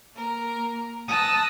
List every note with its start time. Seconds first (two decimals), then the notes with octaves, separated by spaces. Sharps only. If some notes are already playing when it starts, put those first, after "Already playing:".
0.14 A#3 A#4
1.08 A5 D#6 E6 F#6 A#6